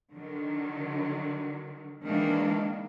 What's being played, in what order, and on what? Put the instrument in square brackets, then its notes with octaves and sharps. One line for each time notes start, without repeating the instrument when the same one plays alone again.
[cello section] D3 D#3 F#3
D#3 E3 G#3 A#3 D4